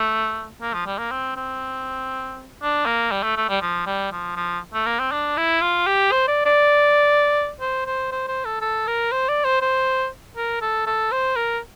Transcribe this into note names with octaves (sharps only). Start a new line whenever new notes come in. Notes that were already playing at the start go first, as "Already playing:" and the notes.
Already playing: A3
A#3
F3
G3
A#3
C4
C4
D4
A#3
G3
A3
A3
G3
F3
G3
F3
F3
A3
A#3
C4
D4
E4
F4
G4
C5
D5
D5
C5
C5
C5
C5
A4
A4
A#4
C5
D5
C5
C5
A#4
A4
A4
C5
A#4